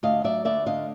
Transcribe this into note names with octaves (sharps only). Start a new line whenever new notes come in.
D2 D#5 F5
F#3 D5 E5
D2 D5 E5
D3 D#5 F5